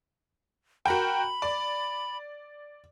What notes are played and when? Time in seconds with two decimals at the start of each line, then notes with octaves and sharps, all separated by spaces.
0.86 F#4 A#4 G5 B5
1.42 D5